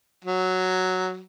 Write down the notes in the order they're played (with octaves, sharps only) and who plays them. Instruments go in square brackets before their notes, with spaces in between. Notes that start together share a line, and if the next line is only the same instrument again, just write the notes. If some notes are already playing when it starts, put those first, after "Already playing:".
[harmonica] F#3